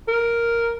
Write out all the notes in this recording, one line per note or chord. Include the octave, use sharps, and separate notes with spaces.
A#4